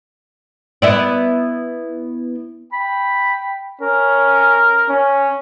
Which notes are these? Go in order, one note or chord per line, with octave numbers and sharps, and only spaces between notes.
B3 E4 D5
G5 B5
C#4 A#4
C#4